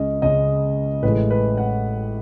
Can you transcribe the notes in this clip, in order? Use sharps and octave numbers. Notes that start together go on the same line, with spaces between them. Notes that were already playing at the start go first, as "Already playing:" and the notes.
Already playing: C#2 C#3 G#3 C#4 D#5
C#2 C#3 G#3 C#4 D#5
A1 A2 G#3 B4
B4
F#5